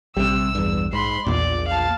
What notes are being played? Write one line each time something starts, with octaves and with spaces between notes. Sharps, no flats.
A#1 C3 G3 E6
E2 G2
G#2 B5 C6
A#1 E2 A#2 D5
F5 A5